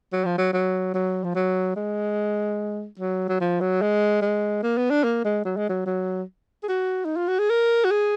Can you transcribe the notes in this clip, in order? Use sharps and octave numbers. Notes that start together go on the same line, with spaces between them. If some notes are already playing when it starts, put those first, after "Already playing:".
F#3
F3
F#3
F#3
F#3
F3
F#3
G#3
F#3
F#3
F3
F#3
G#3
G#3
A#3
B3
D4
A#3
G#3
F#3
G#3
F#3
F#3
G#4
F#4
D#4
F4
F#4
G#4
A#4
F#4
G#4